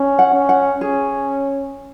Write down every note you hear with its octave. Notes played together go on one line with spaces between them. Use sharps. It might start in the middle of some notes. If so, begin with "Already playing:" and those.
Already playing: C#4
F#5
C#4
F#5
C#4 G#4